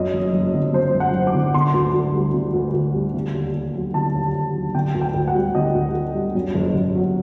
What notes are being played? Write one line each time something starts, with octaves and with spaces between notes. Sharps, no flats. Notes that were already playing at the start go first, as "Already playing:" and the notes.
Already playing: F#2 D#5
F#1
F#1
D3
F#2 C5
F#1
F#5
F#1
D6
D3
D3 C6
D2
D2
G3
D3
D2
D2
G3
D3
D#2
D#2
F#3
D3 A5
D#2
D#2
F#3
D3 G5
D2
G5
D2
F#5
G3
D3 D#5
D2
D2
G3
F#2
F#1
F#1
F#3